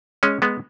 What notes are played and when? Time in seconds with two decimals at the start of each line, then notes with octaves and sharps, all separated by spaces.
0.23 G#3 C#4
0.42 G#3 B3